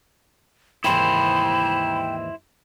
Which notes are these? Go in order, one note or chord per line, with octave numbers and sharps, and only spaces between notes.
D#2 G#2 E3 E4 C5 G5 B5